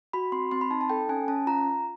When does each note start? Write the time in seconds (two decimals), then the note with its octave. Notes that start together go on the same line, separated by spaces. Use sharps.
0.13 F#4 B5
0.32 C4 C6
0.51 C4 C6
0.61 B5
0.71 D#4 A5
0.81 A5
0.90 A4 G5
1.09 C#4 G#5
1.28 C#4 A5
1.47 F4 A#5